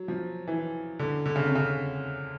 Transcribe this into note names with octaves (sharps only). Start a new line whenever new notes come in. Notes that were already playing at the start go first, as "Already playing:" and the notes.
Already playing: F#3
F3
E3
D3
D3
C#3
C3
C#3